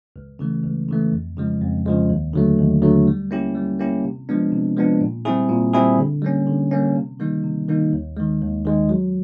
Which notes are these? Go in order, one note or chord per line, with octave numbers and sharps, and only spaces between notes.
C#2
C#3 E3 A3
C#2
C#3 E3 A3
F2
C#3 F3 G#3
F2
C#3 F3 G#3
D#2
D3 F#3 A3
D#2
D3 F#3 A3
G3
A#3 C#4 E4 G4
G3
A#3 C#4 E4 G4
C3
F3 G#3 B3 D4
C3
F3 G#3 B3 D4
A#2
G3 C4 E4 G#4
A#2
G3 C4 E4 G#4
D3
G3 A#3 C#4
D3
G3 A#3 C#4
C3
D#3 G3 A#3 D#4
C3
D#3 G3 A#3 D#4
D#2
D#3 G#3
D#2
D#3 G#3
F#3